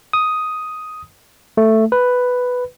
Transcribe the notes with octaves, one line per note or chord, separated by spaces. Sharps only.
D#6
A3
B4